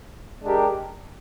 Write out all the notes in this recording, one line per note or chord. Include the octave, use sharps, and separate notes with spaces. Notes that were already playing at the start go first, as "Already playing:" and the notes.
G#3 D4 G4 A#4